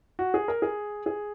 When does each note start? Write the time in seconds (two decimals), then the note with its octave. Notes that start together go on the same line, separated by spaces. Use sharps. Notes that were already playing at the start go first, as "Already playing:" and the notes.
0.19 F#4
0.34 G#4
0.48 A#4
0.62 G#4
1.06 G#4